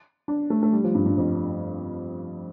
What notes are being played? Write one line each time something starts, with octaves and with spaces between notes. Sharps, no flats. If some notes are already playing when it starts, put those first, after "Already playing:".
D4
A3
A3
G3
F3
G2
G2
F2